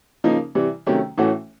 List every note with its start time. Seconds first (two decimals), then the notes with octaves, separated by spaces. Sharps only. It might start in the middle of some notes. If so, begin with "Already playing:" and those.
0.24 C#3 F3 A#3 D#4
0.55 C3 E3 G3
0.86 C3 D#3 F#3 A3 C#4
1.18 A2 E3 A3 C#4 F#4